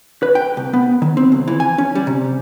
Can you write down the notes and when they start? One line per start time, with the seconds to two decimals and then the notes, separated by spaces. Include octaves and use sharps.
0.23 B4
0.35 G5
0.57 C2
0.73 B3
1.02 D#3
1.17 C4
1.32 C#2
1.48 E3
1.60 G#5
1.78 C#4
1.95 G3
2.07 C3